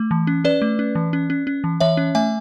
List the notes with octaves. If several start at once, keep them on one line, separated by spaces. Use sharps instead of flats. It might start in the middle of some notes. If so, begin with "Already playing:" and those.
Already playing: A3
E3
C#4
C#4 B4 D5
A3
C#4
E3
C#4
C#4
C#4
E3
E3 C#5 E5
C#4
A3 E5 G#5